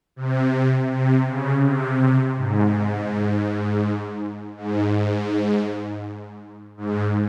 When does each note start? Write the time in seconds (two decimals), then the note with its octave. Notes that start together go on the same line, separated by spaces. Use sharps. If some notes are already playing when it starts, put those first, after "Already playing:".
0.16 C3
0.89 C3
1.26 C#3
1.63 C3
2.37 G#2
4.57 G#2
6.77 G#2